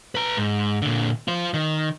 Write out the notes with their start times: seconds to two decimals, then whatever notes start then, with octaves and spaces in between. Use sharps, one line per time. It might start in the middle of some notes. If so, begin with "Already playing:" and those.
0.15 B4 A#5
0.37 G#2
0.82 A#2 D3
1.28 F4 C5
1.54 D#3